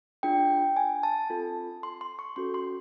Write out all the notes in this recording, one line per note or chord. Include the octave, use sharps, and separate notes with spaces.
D4 F4 G#4 G5
G#5
A5
C4 F4 A4
C6
C6
C#6
C#4 F#4 A4 C6
C6